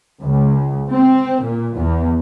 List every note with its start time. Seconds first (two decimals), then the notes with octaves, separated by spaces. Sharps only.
0.22 C#2
0.90 C4
1.42 A#2
1.76 E2